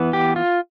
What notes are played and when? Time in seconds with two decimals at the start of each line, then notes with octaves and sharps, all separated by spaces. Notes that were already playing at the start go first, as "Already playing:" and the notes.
Already playing: E3 B3
0.13 G4
0.36 F4